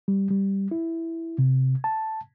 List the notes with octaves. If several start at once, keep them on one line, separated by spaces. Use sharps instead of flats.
G3
G3
E4
C3
A5